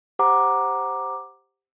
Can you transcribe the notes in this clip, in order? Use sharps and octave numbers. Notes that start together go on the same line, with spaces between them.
G4 C5 F#5 A#5 D6